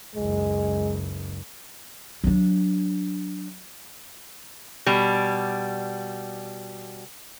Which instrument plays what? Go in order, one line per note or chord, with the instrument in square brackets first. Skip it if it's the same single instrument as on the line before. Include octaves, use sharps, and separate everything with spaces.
[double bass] F#1 C#2 [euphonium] G#3
[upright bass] F#3 D4
[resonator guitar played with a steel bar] B2 G3